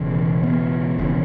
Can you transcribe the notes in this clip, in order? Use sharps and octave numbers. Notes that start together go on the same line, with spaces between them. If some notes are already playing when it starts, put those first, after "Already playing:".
Already playing: E1 E2 C#3
B3
E1 E2 C#3